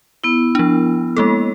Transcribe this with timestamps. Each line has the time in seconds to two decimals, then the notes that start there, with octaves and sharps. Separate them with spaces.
0.24 B3 E4
0.55 F3 D4
1.17 G#3 A#3 A4